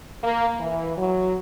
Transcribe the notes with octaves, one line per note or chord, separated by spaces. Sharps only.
A#3
E3
F#3